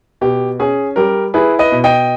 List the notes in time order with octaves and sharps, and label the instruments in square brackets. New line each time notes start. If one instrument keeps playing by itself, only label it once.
[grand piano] B2 G4
C#4 G#4
G3 G4 A#4
E4 G#4 B4
B4 D#5
B2
D#5 G5